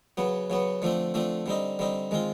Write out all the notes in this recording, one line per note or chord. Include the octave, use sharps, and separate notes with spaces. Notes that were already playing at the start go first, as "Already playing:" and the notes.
C#3 F#3 B3
C#3 F#3 B3
D3 F3 A3 C4
D3 F3 A3 C4
D3 G3 C4 D#4
D3 G3 C4 D#4
D#3 G#3 C4 F4